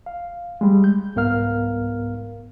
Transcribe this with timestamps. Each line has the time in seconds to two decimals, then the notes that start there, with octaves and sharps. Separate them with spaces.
0.06 F5
0.61 G3 G#3
0.84 G6
1.15 C2 G#2 B3 A#4 F5 F6